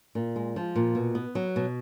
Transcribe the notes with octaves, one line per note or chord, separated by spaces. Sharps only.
A#2
G#3
F3
A#2
B2
B3
F#3
B2